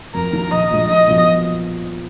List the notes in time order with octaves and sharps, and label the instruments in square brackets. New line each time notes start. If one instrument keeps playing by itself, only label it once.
[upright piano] F2 [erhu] A#4
[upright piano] D#3 A#3 D4
[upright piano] A#1 [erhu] D#5
[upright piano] A#2 F3 G#3 D4
[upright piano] A#1 [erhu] D#5
[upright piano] A#2 F3 B3